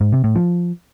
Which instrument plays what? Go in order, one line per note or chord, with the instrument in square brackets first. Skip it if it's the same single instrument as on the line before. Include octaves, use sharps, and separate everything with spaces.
[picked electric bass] G#2
C3
A2
F3